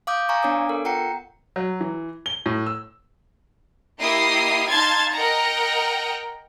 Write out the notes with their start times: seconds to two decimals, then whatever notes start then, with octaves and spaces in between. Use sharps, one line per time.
0.07 F5 D6 D#6 G6
0.29 F5 G#5 A#5 C#6
0.43 B3 D4 C#5 D6 D#6
0.69 B3 A4 A#4
0.85 F4 F#5 G5 A#5 C#7
1.56 F#3
1.81 E3
2.26 G7
2.46 A2
2.66 E6
4.00 A#3 E4 G4 D#5 D#6 C7
4.69 D#4 F5 A5 C6 G#6 A6
5.14 A#4 D#5 F#5 G5 A#5